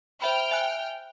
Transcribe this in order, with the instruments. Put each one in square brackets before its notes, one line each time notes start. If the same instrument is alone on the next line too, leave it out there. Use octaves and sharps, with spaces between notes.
[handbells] C5 E5 B5 [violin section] G5 F6
[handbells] E5 G#5 F#6